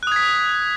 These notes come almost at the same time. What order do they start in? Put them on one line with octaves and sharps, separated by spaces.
F#6 D#6 G#6 B6